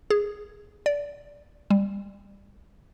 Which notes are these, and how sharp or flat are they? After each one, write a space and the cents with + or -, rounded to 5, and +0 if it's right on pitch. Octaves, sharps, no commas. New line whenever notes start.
G#4 -10
D5 -20
G3 +20